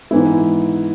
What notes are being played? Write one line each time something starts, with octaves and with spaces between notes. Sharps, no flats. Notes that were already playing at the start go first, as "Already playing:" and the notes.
G#2 E3 B3 E4